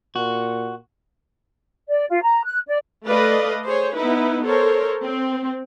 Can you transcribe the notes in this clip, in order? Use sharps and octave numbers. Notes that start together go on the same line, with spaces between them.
A#2 F#4
D5
F4
A#5
F#6
D5
A3 B4 D5 D#5 F5
G#4 C5 C#5
B3 D#4 E4 B4
A4 A#4 C5 C#5
C4